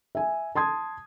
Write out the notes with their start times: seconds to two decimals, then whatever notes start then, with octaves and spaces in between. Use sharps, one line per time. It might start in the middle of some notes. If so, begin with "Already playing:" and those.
0.15 E5 G#5
0.55 A5 C6 D#6 G#6